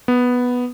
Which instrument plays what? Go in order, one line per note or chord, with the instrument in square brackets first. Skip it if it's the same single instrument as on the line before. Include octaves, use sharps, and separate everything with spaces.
[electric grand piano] B3